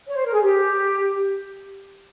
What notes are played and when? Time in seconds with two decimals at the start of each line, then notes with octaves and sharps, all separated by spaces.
0.07 C#5
0.16 C5
0.24 A#4
0.32 G#4
0.41 G4